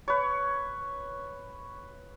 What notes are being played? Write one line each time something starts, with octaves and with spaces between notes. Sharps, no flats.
B4 C#5